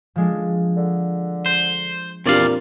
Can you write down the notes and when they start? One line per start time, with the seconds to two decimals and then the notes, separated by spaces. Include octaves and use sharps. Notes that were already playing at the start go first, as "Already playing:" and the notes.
0.16 F3 G#3 D4
0.77 D3
1.46 C5
2.26 E2 A#2 C4 D4 G4 D5 F5